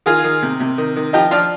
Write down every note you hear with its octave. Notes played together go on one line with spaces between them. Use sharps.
D#3 F4 G#4
D#3
C3
C3
D#3
D#3
F3 D#4 G4
F3 D4 F4